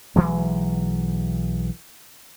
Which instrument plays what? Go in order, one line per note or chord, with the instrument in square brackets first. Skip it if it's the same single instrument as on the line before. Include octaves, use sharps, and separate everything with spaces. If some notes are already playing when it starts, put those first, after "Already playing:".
[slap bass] B1 E3 F#3 G#3